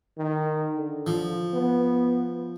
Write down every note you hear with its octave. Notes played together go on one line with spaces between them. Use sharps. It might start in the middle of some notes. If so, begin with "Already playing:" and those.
D#3
D3
F3
B3